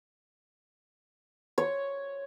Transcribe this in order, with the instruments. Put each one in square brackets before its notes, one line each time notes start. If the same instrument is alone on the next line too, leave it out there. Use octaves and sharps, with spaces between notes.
[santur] C#5